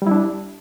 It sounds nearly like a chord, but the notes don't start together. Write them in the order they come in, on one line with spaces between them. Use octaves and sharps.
G3 E4 D4